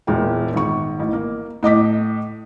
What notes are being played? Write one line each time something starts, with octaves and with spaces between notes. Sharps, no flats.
E1 A#2 G#3 G5
G#1 C#6
A1
A#3
A2 D#5 D6 B6